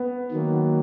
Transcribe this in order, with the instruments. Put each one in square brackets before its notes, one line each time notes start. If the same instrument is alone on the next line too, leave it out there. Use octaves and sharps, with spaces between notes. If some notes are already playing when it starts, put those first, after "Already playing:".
Already playing: [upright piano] B3
[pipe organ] D#3 F#3 A#3